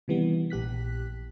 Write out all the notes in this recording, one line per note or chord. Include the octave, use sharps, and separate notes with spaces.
C3 D#3 E3 G3 B3
A#1 G4 F#6 B6